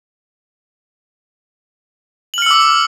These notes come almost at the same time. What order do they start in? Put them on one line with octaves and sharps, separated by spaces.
F#7 F6 C#7 E6 D6